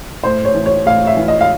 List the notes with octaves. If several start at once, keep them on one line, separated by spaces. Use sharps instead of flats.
A2 C5
C#5
E3
C#5
A2 F5
E5
E3
D#5
F5